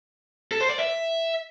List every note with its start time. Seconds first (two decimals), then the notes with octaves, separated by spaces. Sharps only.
0.51 A4
0.61 C5
0.70 D5
0.79 E5